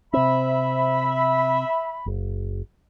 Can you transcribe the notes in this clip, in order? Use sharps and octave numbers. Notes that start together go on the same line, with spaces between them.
C3 C4 E5 B5
F#1